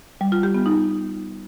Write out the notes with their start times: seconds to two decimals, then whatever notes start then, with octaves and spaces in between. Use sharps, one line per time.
0.21 G3
0.32 F4
0.43 G4
0.55 B3
0.66 D#4